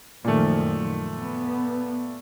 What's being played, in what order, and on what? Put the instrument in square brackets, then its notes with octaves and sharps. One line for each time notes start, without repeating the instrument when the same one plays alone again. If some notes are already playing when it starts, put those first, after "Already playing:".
[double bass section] F#2 D#3 F3 [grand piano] A#2 A3
[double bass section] B3